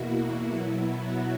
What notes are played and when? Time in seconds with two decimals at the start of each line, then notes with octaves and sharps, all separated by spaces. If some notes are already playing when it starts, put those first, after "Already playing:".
Already playing: E2 B2 A#3 E4 F#4
0.47 B2 F#3 B3 E4
1.07 F#4